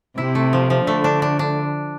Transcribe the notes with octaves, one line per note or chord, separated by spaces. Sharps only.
C3 E4
A3
F3
F3
D3 A3
D4
D4
D4